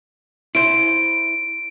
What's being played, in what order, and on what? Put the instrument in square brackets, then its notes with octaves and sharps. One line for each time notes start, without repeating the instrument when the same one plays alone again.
[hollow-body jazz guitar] E4 C5 [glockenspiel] D7